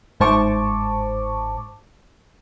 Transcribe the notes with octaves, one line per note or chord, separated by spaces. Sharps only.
G1 G#2 C5 A5 C#6 D6